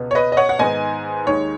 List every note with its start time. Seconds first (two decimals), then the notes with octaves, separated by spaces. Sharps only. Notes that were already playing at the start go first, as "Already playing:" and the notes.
Already playing: C#2 B2 B3
0.11 C#5
0.15 B4 D#5
0.32 D#5
0.37 C#5 F#5
0.49 F#5
0.59 G#2 D#3 B3 D#4 D#5 G#5
1.26 D#2 D#3 G#3 C#5